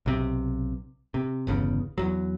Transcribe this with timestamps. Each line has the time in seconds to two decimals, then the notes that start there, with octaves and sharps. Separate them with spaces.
0.06 B1 C3
1.14 C3
1.47 G1 E2 C#3
1.98 E2 F#3